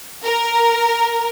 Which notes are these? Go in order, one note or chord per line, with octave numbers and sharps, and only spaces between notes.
A#4